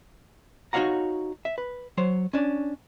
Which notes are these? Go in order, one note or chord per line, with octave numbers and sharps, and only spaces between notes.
D#4 F#4 C#5 F5 F#5 A#5
E5
B4
F#3 C5 C#5
C#4 D4